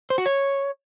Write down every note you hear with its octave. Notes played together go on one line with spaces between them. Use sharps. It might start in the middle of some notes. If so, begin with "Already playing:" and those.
C5
F#4
C#5